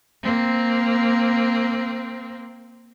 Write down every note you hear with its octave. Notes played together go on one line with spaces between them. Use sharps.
A#3 C4